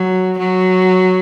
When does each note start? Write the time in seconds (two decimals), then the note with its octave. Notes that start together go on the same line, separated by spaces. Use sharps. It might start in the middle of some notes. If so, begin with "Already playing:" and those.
Already playing: F#3
0.38 F#3